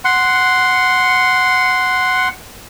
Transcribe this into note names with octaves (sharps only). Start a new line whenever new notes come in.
F#5 C6